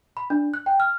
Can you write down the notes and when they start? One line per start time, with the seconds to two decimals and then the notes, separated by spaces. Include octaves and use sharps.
0.17 B5
0.30 D4
0.54 F#6
0.66 G5
0.80 F6